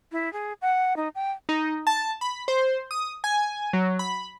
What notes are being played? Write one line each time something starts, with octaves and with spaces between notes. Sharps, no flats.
E4
G#4
F#5
D#4
G5
D#4
A5
B5
C5
D#6
G#5
F#3
B5